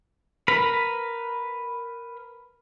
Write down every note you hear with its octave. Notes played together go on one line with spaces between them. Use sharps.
A#4 B4 B5